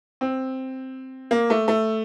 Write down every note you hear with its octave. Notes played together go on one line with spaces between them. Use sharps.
C4
A#3
A3
A3